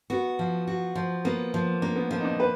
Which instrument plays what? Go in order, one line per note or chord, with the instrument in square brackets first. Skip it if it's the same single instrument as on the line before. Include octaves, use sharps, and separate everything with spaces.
[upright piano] B3 [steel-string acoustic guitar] F#4
[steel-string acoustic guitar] F3
F#4
F3
[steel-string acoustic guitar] A#3 [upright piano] B3
[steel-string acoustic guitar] F3
[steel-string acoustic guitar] A#3 [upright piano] D4
[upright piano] B3
[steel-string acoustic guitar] F3 [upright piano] B3
[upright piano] D#4
D4
B4